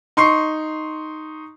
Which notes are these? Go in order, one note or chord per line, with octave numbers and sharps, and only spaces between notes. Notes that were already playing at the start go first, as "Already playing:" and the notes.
D#4 C6 C#6 C7